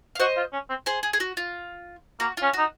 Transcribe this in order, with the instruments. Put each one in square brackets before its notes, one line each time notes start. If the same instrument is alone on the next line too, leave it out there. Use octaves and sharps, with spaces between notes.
[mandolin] F5
[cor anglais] F#4 [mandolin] C5 D#5
[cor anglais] F4
C#4
C4
[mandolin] G#4 C5
G#4
G#4
F#4
F4
[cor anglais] A#3 [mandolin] F#4
[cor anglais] C#4 [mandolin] F4
[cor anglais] D#4 [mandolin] F#4